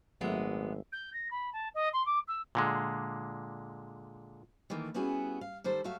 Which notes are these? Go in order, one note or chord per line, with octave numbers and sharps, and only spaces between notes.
G#1 A#2 F#3 G#3 A3 B3 E5
G6
A#6
B5
A5
D#5
C6
D6
E6
A#2 D3 G#3
D#3 E3 A3 A#3
G3 B3 C#4 E4 F#4 G#4
F5
D#3 G3 A4 C5
F#3 A3 F#4 E5 F5